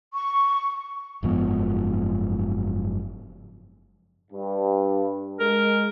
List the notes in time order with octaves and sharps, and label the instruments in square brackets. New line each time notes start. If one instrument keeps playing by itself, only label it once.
[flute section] C#6
[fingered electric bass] F#1 G#2 F3 B3
[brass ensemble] G2
[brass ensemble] G#3 [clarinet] A#4